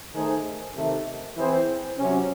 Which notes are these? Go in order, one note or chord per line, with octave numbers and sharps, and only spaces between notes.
D#3 A3 D#4 G#4 C5
C3 D#3 A3
E3 C4 E4 G#4 C5
C3 F#3 C#4